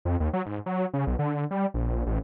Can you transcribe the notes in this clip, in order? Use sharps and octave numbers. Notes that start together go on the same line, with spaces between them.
F2
D#2
F#3
G#2
F#3
C#3
B1
D3
G3
A#1
A1